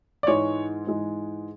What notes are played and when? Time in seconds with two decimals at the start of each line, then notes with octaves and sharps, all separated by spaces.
0.23 D5
0.27 G#2 E3 G#3 C#5
0.87 G#2 E3 G#3